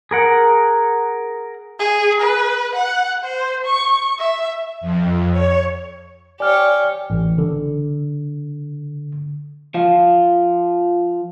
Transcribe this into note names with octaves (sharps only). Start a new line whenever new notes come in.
G#4 A#4 F#5
G#4
B4
F#5
C5
C#6
E5
F2
C#5
G4 C#5 D5 G#5 F6
A1
D3
F3 F4